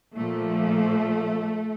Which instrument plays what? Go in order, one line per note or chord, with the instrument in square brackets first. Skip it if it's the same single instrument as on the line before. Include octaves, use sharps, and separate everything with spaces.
[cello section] A#2 F3 A3